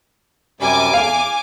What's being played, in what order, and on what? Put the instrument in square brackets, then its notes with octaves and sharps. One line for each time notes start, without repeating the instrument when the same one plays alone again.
[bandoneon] F#2 C3 G3 [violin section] G#5 D6
[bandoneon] E2 [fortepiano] F5